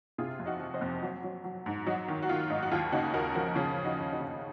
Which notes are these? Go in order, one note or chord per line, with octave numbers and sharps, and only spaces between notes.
C3 F4 G#4
F2
D#4 F#4
F3
C5 D#5
F2
F#3
F#3
F#3
G#2
F#3 D#4 F#4
D#3
F#4
D#3 F4
G#2 D#4
F#4
D#2 F4
C#3 D#4 F#4
D#2 F#4 A#4
F3 F#4 A#4
C#3 F4 G#4
F3
D#4 F#4
D#2
D#4 F#4
C#3